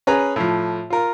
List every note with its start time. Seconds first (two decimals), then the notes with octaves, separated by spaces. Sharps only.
0.07 C#4 G#4 B4 A#5
0.36 A2 F3
0.90 F4 A#4